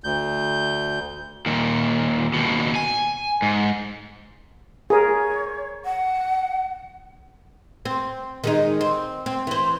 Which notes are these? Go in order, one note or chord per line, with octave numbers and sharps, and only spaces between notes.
D2 G6
D#2 A#2
D#2 B2
G#5
G#2
G#4 A#4 C#5
F#5
C4
D#3 G#3 D#4
C4
C4
E3 C5